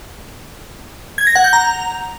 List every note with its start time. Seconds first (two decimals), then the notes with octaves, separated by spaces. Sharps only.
1.18 G#6
1.27 A#6
1.35 F#5
1.44 G6
1.53 A#5